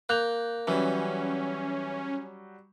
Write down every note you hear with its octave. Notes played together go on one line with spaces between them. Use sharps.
A#3 F#6 G6 F7
E3 F#3 G3 C#4